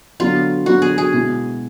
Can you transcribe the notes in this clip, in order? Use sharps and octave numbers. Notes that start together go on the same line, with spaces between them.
D3 F#3 B3 F4
D3 F#3 B3 F#4
G#4
G#4
B2 G#3 B3 E4